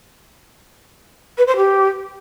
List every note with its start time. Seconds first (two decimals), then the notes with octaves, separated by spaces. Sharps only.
1.37 B4
1.47 C5
1.56 G4